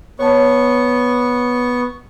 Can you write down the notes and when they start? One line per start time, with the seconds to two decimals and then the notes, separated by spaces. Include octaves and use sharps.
0.19 B3 C#5 A5 C#6